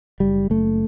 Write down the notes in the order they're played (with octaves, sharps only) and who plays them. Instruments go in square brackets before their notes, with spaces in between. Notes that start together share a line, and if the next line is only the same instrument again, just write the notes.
[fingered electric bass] F#1 G3
F#1 A3